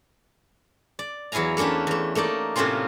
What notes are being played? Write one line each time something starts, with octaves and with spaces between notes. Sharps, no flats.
D5
E2 F#3 E4 F5 G#5 A#5
A3 A#3 C#4 D4 G4
E2 A3
A3 A#3 D#4 D5
A2 C3 A#3 C4 C#4 F4